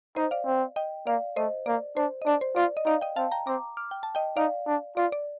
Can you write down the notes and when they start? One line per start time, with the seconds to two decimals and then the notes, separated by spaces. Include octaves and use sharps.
0.16 D#4 C5 D#5
0.31 D5 F5
0.46 C4
0.76 D#5 G5
1.07 A#3 D5 F5
1.36 A3 C5 D#5
1.66 A#3 D5
1.97 D4 C5
2.22 D#5
2.26 D4 D5
2.41 C5
2.56 F4 D5
2.77 D#5
2.86 D#4 D5 F5
3.01 D#5 G5
3.16 C4 F5 A5
3.32 G5 A#5
3.47 C4 A#5 D6
3.77 D6 F6
3.91 G5
4.03 A5
4.15 D#5 G5
4.37 D#4 D5 F5
4.67 D4
4.97 F4 D5
5.12 D5